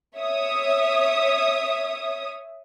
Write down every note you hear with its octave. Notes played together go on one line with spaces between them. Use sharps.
C#5 E5 D#6